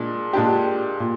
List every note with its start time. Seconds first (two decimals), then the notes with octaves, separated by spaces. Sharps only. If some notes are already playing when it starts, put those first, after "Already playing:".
Already playing: A#2 G#3 D4
0.33 A#2 G#3 D4 G4
1.00 A#2